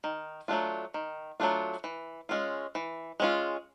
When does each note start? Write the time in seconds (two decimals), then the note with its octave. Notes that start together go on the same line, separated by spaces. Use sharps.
0.04 D#3
0.48 F#3 A3 D4 F4
0.94 D#3
1.40 F#3 A3 D4 F4
1.84 E3
2.29 G#3 C#4 F4
2.75 E3
3.20 G#3 C#4 F4